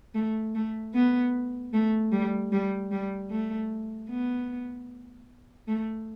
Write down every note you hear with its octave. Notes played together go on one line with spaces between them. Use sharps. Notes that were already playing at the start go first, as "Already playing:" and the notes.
A3
A3
B3
A3
G3
G3
G3
A3
B3
A3